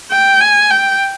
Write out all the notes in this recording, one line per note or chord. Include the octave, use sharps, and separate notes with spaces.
G5
G#5
G5